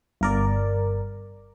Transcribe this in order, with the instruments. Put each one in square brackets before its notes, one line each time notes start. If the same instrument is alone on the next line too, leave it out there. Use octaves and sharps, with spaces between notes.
[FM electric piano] G1 A#4 D5